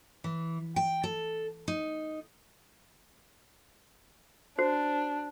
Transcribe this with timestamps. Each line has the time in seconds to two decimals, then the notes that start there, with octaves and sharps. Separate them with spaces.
0.24 E3
0.76 G5
1.04 A4
1.68 D#4
4.58 D4 F#4 C5